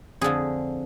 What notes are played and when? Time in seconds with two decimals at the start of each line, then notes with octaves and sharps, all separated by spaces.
0.21 F2 D3 F3 G#4